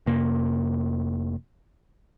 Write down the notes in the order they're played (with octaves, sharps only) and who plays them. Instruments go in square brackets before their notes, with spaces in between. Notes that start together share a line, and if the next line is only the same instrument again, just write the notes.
[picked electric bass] F1 F2 C3 A#3